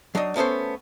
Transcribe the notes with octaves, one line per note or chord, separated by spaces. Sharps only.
F#3 D4 D#4 D#5
A3 B3 C#4 A4 C5